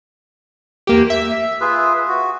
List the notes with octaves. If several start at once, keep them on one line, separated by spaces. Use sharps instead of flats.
E2 A#3 G4
E5
F4 G#4 B4
F#4